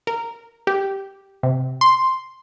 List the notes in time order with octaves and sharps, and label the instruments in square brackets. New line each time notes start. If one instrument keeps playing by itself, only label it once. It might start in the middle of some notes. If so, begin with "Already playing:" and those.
[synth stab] A#4
G4
C3
C6